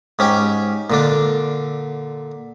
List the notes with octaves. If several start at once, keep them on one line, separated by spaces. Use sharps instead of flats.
G#2 C#4 G4
A#2 D3 D4